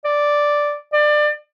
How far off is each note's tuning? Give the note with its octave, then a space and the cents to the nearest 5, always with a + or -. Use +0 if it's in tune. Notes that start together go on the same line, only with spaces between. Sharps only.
D5 +0
D5 +25